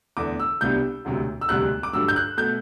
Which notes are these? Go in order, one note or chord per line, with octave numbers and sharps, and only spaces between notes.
E2 D3 A3 D4 D6
E6
C2 B2 G3 B3 D4 G6
E1 D2 C3 F#3
E6
E1 D2 C3 G3 F#6
D6
G2 D3 F#3 E6
G6
F#6
B2 A3 G6